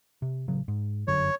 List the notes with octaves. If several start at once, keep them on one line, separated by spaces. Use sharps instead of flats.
C3
A1 C#3 F#3
G#2
G1 F#2 D3 C#5